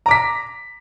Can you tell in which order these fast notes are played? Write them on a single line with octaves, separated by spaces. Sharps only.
A#5 D6 B6